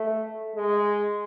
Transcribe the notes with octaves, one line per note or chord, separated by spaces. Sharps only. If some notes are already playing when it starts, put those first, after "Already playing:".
Already playing: A3
G#3